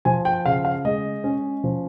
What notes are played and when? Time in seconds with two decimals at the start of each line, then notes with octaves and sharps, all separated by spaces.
0.05 F3 G#5
0.25 G5
0.46 C#3 F5
0.65 F5
0.85 G#3 D#5
1.24 C#4
1.64 F3